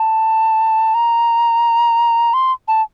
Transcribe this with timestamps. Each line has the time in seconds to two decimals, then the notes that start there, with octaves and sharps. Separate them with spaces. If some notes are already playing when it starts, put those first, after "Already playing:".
Already playing: A5
0.94 A#5
2.33 C6
2.68 A5